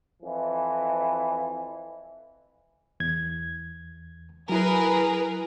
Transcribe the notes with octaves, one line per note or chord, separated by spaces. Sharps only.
F2 E3
E2 G#6
F#3 E4 G#4 A#4 B4